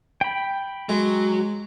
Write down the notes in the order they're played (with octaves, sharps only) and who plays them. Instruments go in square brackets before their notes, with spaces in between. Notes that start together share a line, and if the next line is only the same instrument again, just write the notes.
[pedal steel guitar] G5 B5
[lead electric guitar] F#3 [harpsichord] G#3